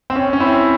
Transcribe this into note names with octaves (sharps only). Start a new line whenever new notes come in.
C4
C#4
C#4
C4 E4